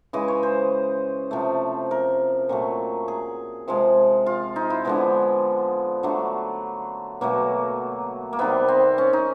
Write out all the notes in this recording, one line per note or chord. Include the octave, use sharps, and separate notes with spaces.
C#3 E3 G#3 D#5
C#5
C5
C3 F3 A3
A#4
A#2 F#3 A3
G#4
C3 F3 G#3
F4
D#4
E4
D3 F3 G#3 B3
D3 F#3 A3
B2 F#3 A3 A#3
A#3
C3 D#3 G3 B3
C4
C#4
D#4